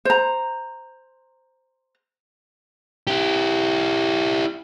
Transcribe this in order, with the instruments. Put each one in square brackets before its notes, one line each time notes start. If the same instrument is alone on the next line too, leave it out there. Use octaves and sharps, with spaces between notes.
[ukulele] C5 A#5
[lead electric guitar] E4 G4